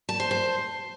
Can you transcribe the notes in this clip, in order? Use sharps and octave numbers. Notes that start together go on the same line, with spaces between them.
A5
C5
C5